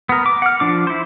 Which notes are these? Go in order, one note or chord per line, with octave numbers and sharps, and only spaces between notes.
B3 A#4
D6
F#5 F6
F3 D4 D6
E4 C5